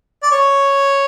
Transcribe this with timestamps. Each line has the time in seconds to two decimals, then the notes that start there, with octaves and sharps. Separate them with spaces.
0.23 D5
0.31 C#5